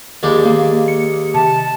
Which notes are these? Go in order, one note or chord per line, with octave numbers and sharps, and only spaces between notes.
D#2 G#3 D5
A#3
C#7
C3 A5